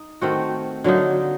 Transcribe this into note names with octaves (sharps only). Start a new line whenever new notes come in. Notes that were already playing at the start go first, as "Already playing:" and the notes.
Already playing: D#4
D#3 A3 C4 F#4
D3 F#3 A#3 D#4